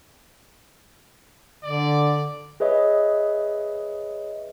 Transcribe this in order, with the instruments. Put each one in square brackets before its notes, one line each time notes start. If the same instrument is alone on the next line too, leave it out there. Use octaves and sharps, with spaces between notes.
[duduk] D3 [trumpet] D5
[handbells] G#4 B4 C#5 D#5 E5